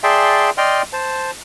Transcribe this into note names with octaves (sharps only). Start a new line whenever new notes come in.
G#4 D5 E5 G5 A5 C6
D5 D#5 G5 C6 F6
C5 A5